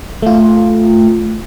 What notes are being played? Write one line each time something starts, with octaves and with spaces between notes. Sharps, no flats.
A3 F4